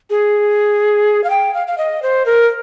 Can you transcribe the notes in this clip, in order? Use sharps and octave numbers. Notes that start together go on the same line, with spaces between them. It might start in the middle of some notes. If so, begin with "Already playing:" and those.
G#4
F5
G5
F5
F5
D#5
C5
A#4